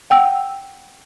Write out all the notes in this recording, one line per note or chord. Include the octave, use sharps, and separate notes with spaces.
F#5 G5 E6